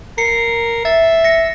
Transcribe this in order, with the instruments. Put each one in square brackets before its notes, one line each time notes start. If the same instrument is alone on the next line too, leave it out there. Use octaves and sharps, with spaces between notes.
[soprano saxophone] A#4 [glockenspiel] C7 C#7
[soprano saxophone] E5 [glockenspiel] A6
[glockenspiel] A#6 C#7